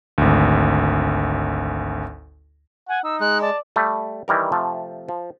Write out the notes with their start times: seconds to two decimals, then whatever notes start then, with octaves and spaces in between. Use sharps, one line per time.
0.18 G#1 D2
2.89 F#5 G#5
3.04 D#4 E6
3.20 G#3 F#6
3.42 D5 A5
3.76 G3 A3
4.28 D#3 E3 G3 A#4
4.52 C3 F3 A3
5.09 F3